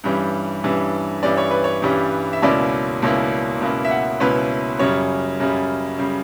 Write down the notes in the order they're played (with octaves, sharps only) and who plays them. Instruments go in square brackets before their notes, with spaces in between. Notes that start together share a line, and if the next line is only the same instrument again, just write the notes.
[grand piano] G2 E3 G3 C#4
G2 E3 G3 C#4
G2 E3 G3 C#4 D5
C#5
B4
C#5
G2 E3 G3 C#4
E5
C#2 B2 A#3 C#4 E4 D5
C#2 B2 A#3 C#4 E4
C#2 B2 A#3 C#4 E4
E5
F#5
C#2 B2 A#3 C#4 E4 B4
F#2 C#3 G3 C#5
F#2 C#3 G3
C#3 G3